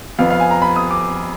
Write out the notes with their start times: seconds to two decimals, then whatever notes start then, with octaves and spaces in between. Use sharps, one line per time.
0.19 F2 F3 B3 F5
0.30 F5
0.40 G#5
0.51 A#5
0.62 B5
0.76 D#6
0.91 D6